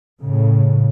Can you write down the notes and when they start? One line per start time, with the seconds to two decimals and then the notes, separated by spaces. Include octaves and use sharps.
0.21 A2 C#3